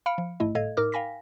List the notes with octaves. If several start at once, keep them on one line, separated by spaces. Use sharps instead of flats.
F5 B5 F6 C#7 D7
F3
A1 G#2 A3 E4 D#5
G1 A2 A4 D#5 F5 G#6
A2 D#4 A#4 D6 F6
F5 G5 G#5 B5 A#6 B6